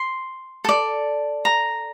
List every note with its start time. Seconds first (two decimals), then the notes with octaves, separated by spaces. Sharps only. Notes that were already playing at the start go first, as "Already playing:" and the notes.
Already playing: C6
0.65 A4 D5
1.45 A#5